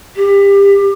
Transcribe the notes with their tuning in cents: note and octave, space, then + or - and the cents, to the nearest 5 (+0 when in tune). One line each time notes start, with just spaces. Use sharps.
G4 +25